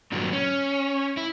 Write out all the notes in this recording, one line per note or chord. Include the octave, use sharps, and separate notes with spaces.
G2 A#2 D3 F#3
C#4
E4